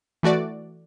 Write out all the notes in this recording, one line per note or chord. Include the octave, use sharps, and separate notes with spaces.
E3 A3 F#4 D5